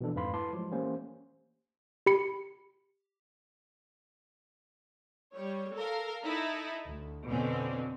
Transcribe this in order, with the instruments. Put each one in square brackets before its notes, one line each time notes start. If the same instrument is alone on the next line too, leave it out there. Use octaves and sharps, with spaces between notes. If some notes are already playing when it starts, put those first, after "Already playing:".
[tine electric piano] B2 E3 F3 D4 A4
F2 G#2 B4 F5 B5 C6
A3 E4 B4 A5 C6 D6
F3 F#3 G#3
E3 A3 A#3 C#4 G4 C5
[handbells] G4 B5 C#7
[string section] G3 C#5
A4 A#4 F5
D#4 E4 A4
D2
F2 B2 D3 C4 C#4